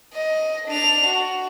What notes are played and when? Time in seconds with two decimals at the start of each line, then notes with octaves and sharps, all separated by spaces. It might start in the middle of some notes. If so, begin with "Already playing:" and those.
0.14 D#5
0.68 D4 F7
1.06 F#4